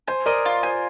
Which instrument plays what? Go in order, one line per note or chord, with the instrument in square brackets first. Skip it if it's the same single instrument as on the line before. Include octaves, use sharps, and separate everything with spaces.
[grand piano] C5 [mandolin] G#5
[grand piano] A#4 D5 [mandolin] D#5
[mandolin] F4
[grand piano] C5 [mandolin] G#5